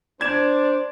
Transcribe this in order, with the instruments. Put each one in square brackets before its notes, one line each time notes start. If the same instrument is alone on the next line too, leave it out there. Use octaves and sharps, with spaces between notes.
[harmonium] D4 C5 [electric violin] D5 [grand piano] G#6 E7